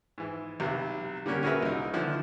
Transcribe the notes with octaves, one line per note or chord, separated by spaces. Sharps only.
G#2 E3
B1 C3
D3 G3 A#3 C#4
C#4 F#4 G#4 A#4 B4 E5
C2 D#4
D3 D#3 F3 E4